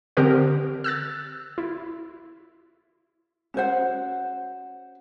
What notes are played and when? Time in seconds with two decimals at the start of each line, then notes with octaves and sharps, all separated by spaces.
0.17 D3 C4 G4 A#4 C5
0.84 E6 F#6 A6
1.58 E4
3.54 C#4 F#4 C5 F#5